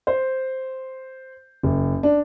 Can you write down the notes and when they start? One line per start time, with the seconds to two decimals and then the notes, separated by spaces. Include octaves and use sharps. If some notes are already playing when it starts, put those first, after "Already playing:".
0.07 C5
1.63 F#1
2.03 D4